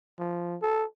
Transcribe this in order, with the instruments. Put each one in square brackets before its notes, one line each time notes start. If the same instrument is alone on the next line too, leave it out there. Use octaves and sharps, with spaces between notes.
[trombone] F3
A4